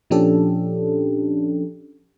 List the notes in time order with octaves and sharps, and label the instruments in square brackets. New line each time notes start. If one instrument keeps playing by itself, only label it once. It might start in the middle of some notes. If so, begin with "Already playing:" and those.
[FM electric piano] A#2 F3 C#4 D4 G4 A4